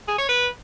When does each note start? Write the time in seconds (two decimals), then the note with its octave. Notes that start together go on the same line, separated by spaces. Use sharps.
0.08 G#4
0.18 C#5
0.28 B4